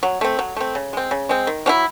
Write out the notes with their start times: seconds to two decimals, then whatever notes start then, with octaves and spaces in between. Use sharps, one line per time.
0.03 F#3
0.21 A3 C4
0.39 F#3
0.56 A3 C4
0.75 C#3
0.93 G#3 C4
1.11 C#3
1.29 G#3 C4
1.47 D#3
1.66 F#3 C#4 E4